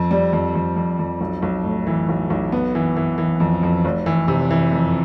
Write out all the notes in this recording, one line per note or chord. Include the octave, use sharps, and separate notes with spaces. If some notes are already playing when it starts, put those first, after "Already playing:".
Already playing: F2
G3
F2
F2
F2
F2
B1
B1
A2
E3
B1
B1
B3
E3
E3
E3
F2
F2
F1
E3
C3
E3
F2